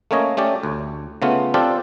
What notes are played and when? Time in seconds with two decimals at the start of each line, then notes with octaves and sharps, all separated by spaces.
0.11 A3 A#3 C#4 C#5 D#5
0.37 A3 C#4 G4 D5
0.63 D2
1.22 C#3 A3 B3 F4
1.54 C4 D4 F4 G4 A4